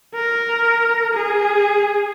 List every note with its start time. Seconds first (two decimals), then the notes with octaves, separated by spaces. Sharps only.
0.14 A#4
1.14 G#4